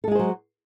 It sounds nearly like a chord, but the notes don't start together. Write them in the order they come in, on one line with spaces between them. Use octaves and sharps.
A4 G#3 G#4 C5 F#3